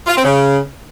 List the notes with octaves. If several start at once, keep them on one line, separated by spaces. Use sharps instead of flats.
F4
C4
C#3